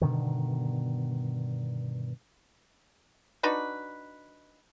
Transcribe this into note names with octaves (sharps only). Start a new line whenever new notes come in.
G2 B2 D3 D#3
D4 D#4 F#4 B4